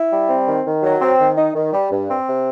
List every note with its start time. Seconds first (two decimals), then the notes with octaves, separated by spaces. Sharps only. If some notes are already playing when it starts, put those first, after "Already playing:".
Already playing: E4
0.10 G3
0.28 C4
0.47 D#3
0.65 D#3
0.83 F#3
1.01 C4
1.19 D#3
1.37 D#4
1.55 D#3
1.73 G3
1.91 G2
2.09 C4
2.27 C3